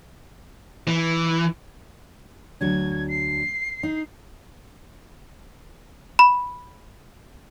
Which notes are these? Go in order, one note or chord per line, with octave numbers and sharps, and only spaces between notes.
E3
D2 F#3 D4 G#6
C7
D#4
B5